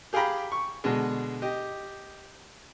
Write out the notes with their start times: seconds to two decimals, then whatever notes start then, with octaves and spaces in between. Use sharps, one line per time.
0.13 G4 G#4 F5 G5 A#5 B5
0.52 C#6
0.84 B2 D3 G#3
1.42 G4 D#5